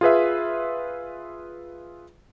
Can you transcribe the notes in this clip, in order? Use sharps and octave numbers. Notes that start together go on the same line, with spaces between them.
F4 G#4 B4 E5